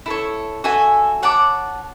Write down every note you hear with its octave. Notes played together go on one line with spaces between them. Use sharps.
E4 A4 C#5
F#4 A4 E5 G#5
C#5 F#5 A5 D6